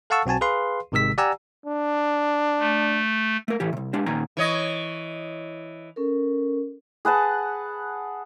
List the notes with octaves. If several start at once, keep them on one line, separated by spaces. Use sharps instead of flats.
A4 F5 F#5 A5 C#6 E6
B1 C4 F#4 G#5 A5
G#4 B4 F5 C6
G#1 C3 D#3 G#3 E6 B6
G4 D5 F#5 G#5 A#5 E6
D4
A3
A3 A#4
A2 E3 G4
C2 C3
G#3 D4 G4
A#2 D#3 G#5 A#5
E3 C#5 D#5
C#4 A4 A#4
G#4 B4 F#5 A5